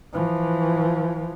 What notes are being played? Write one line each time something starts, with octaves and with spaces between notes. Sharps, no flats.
E3 F3